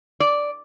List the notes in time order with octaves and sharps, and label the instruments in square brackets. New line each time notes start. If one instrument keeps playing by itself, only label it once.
[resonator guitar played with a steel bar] D5